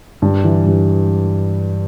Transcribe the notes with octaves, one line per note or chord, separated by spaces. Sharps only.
G2
E3
G2